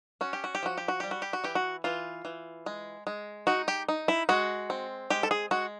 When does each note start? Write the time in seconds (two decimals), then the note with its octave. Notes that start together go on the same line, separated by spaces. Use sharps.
0.21 C#4 F#4
0.33 G4
0.44 F#4
0.55 G4
0.63 F3 F#4
0.78 G4
0.88 F#4
1.00 G3 G4
1.11 F#4
1.22 G4
1.33 F#4
1.44 E3 G4
1.55 F#4
1.84 E3 F4
2.25 E3
2.66 G#3
3.07 G#3
3.47 D#4 F#4
3.68 G4
3.89 D#4
4.08 E4
4.29 G#3 F#4
4.70 C4
5.10 G#3 G4
5.23 A4
5.31 G#4
5.51 G#3 F#4